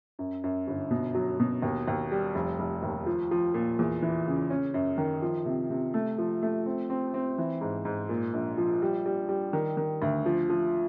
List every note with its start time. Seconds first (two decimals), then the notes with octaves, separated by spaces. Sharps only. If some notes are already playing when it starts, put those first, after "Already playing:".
0.19 F#2
0.44 F#2
0.67 G1
0.91 B2
1.15 F#3
1.39 B2
1.62 D#2
1.88 D#2
2.12 G3
2.35 F1
2.59 F1
2.83 D#2
3.06 F3
3.31 F3
3.54 A#2
3.79 E2
4.02 E3
4.26 C#3
4.50 C#4
4.74 F#2
4.98 D#3
5.22 F3
5.46 C3
5.70 C3
5.94 A3
6.18 F3
6.43 A3
6.66 C4
6.90 C4
7.14 C4
7.38 E3
7.61 G#2
7.85 G#2
8.09 A#2
8.34 A#1
8.58 F3
8.82 G3
9.06 G3
9.29 G3
9.53 D#3
9.77 D#3
10.02 D2
10.26 F3
10.49 F3